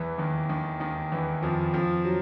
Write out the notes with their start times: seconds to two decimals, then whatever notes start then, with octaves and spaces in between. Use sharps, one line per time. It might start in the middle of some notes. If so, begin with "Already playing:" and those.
Already playing: E2 E3
0.18 D#2 D#3
0.49 D#2 D#3
0.80 D#2 D#3
1.12 E2 E3
1.43 F2 F3
1.74 F2 F3
2.05 F#3